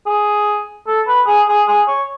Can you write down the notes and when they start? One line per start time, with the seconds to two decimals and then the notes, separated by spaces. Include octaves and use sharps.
0.06 G#4
0.87 A4
1.07 B4
1.27 G#4
1.48 G#4
1.68 G#4
1.88 C#5